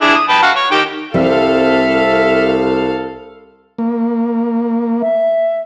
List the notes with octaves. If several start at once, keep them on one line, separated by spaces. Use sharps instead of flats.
D4 E4 G#4
D#6
B4 G5 A5
F#4 F5 F#5
C#5
D#3 G4 G5
C2 G3 C4 A4 E5 F5
A#3
E5